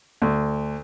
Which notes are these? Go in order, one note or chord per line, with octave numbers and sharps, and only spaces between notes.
D2